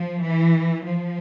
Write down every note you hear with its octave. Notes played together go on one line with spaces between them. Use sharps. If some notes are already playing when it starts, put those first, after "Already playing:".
Already playing: F3
E3
F3